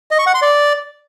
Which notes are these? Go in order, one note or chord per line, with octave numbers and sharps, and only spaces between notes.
D#5
C#6
F#5
C6
D5